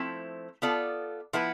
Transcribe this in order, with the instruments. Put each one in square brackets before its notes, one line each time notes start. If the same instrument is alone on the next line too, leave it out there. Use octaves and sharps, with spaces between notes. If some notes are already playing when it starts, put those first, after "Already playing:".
Already playing: [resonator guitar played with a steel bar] F3 A3 C4 E4
B3 F4 A4 D5
F3 B3 E4 B4